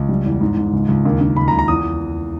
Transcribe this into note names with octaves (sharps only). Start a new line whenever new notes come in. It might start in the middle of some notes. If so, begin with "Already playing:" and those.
Already playing: C#2
G3
E2
G#2
G#2
C#2
C#2
D#2
D#2
C#2 B5
A#5
C#2
A#5
E2 D#6